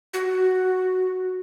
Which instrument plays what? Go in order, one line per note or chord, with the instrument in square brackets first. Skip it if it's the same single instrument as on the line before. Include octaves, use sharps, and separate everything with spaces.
[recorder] F#4